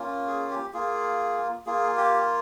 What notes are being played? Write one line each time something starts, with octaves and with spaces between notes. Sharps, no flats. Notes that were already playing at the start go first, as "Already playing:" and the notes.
Already playing: A#3 C#4 F4
G#4
G4
A#3 F4 G#4
A#3 F4 G#4
G4